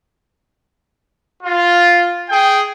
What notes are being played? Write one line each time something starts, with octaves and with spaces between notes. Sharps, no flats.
F4
G#4 G5